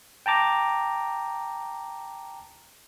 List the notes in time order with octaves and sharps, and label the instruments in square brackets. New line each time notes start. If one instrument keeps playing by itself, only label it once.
[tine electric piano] G5 A5 A#5 D6